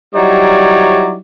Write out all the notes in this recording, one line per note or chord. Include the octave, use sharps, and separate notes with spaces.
F#3 G3 D#4 E4 C#5 D5